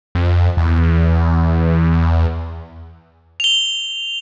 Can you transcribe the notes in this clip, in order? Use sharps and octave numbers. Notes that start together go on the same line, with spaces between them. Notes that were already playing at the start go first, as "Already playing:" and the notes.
F2
E2
F7 G7